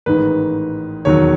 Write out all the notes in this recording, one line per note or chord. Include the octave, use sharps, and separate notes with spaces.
A1 G#2 D#3 B4
E1 D#2 D#3 F#3 C#5